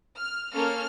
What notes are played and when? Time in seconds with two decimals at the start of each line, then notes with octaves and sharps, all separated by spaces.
0.16 F6
0.53 A#3 C#4 A4 F6